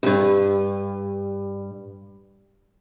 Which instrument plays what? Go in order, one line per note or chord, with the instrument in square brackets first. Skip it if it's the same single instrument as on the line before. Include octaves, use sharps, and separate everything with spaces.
[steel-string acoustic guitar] D2 G2